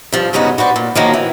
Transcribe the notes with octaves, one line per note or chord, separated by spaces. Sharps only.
G2 F3
G2 C#3 G#3 B3 D#4 F#4
F#4 B4 C5 D5
A#2
D#3 F3 F#3 A#3
E3